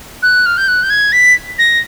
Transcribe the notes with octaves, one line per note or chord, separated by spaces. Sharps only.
F#6
F6
G6
F#6
G6
G#6
B6
A#6